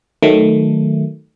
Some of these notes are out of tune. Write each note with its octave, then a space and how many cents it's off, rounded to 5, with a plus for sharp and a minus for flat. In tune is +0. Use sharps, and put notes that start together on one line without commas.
D#3 +0 F#3 +0 A3 +0